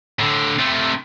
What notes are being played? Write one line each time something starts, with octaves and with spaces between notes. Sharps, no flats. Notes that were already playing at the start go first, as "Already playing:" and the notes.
A2 D3
C3 A3